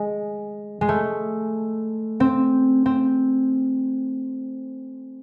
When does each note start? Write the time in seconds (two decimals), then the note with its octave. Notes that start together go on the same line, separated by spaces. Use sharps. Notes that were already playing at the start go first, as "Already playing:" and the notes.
Already playing: G#3
0.81 G#3
0.89 A3
2.20 C4
2.86 C4